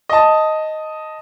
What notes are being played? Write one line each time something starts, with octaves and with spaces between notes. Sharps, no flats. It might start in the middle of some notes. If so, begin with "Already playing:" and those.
D#5 A5